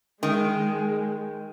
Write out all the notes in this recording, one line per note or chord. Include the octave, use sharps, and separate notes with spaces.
D#3 G#3